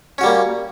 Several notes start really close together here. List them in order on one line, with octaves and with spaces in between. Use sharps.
C#4 F#4 G3 A#3